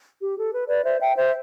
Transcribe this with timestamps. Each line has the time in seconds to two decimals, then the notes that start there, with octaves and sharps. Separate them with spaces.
0.21 G4
0.38 A4
0.53 B4
0.68 B4 D5
0.84 C5 E5
1.00 E5 G5
1.15 C5 E5